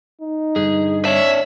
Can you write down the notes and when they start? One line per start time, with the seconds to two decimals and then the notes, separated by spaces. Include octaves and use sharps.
0.21 D#4
0.56 G2 D3 G#4
1.05 D4 C#5 E5